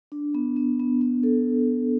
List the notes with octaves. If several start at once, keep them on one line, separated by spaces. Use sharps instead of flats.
D4
B3
B3
B3
B3
A4